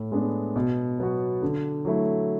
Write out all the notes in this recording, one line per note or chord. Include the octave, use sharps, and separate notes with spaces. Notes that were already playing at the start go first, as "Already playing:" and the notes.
Already playing: A2
G#3 B3 D4
B2
F#3 B3 F#4
D3
F#3 A3 E4